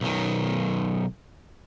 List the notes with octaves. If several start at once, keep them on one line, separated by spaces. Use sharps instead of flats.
B1 D#3